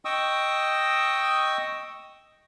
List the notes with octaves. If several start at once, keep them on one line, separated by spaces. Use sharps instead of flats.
D#5 G5 C#6 D#6 E6